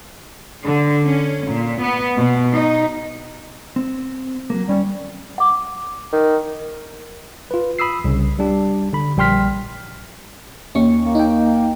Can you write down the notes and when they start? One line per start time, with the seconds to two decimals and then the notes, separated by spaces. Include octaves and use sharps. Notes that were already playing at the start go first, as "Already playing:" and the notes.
0.65 D3
1.07 C#4
1.49 A#2
1.81 B3
2.18 B2
2.55 D#4
3.76 C4
4.50 F#3 A#3
4.68 D#2 G3 C#4 C#5
5.38 F#5 D6
6.12 D#3
7.51 F4 B4
7.79 B5 D#6 E6 C7
8.04 C2 C#3
8.39 G3 D4 G4
8.93 D3 B5
9.17 A#1 G3 G5 C6 F6 B6
10.75 D#2 C#4 C#6
11.02 A#3
11.15 D#4 G5